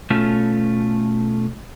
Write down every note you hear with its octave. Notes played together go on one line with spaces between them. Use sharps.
B2 A3 C#4 F4